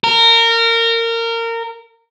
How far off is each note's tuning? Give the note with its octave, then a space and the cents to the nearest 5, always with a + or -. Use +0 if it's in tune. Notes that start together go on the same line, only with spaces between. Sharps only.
A#4 -20